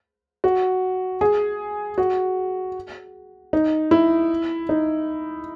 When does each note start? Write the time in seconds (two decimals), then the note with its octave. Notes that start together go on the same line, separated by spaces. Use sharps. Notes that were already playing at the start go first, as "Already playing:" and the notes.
0.44 F#4
1.21 G#4
1.98 F#4
3.53 D#4
3.91 E4
4.69 D#4